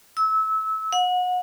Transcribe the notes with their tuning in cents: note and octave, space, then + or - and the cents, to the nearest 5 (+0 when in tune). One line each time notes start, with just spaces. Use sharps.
E6 -25
F#5 -30